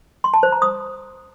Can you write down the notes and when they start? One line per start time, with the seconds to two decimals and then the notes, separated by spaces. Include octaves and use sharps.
0.24 C6
0.34 A5
0.43 C5
0.52 A#5
0.62 D#6